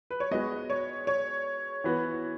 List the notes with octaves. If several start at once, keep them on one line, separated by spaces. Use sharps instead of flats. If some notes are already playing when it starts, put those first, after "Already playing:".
B4
C#5
G#3 B3 F#4 D#5
C#5
C#5
E3 B3 F#4 B4